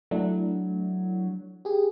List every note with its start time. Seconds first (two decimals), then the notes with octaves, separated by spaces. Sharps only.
0.11 F#3 A3 D4 E4
1.65 G4 G#4